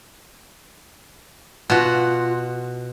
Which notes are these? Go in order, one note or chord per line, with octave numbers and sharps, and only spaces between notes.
B2 F4 F#4